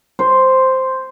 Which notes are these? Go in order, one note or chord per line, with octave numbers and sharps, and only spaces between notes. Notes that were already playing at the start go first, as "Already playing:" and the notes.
C5